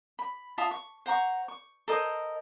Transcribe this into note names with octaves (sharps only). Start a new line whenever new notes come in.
B5
F4 E5 A5 D#6
C#6
C5 F#5 A#5 C#6
C#6
A4 A#4 C5 D#5